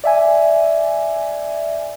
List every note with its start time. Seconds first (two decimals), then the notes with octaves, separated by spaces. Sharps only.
0.04 D5 E5 G#5